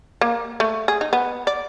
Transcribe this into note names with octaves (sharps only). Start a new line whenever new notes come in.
A#3
A3
G#4
D#4
B3
D5